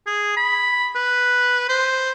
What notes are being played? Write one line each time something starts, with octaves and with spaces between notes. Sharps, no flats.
G#4
B5
B4
C5